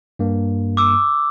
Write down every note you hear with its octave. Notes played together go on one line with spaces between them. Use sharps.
G2 A#3
D6 E6